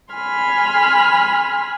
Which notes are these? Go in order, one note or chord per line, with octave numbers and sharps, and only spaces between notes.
G#5 B5 C6 F6